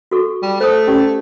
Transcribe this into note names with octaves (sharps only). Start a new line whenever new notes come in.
F#4 A4 C#6
G3
A3 C5 D#6
C#4 G4 D5